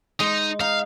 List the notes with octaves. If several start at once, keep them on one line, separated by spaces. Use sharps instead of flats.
G#3 D#4
D#4 F5